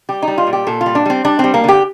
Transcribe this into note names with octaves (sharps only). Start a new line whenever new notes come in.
G3 G4
D#4
G3
F4
A#2
G4
A#2 A4
F4
G3
D4
G3 C4
G3 D4
G3 C4
A#3
D3 G4